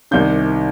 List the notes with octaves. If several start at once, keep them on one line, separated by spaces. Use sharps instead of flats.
C2 C3 D#3 G6